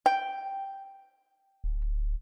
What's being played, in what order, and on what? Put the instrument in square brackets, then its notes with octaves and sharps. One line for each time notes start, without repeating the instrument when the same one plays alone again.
[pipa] G5
[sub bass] D1